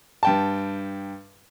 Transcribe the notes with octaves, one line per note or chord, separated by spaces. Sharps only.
G2 G5 A5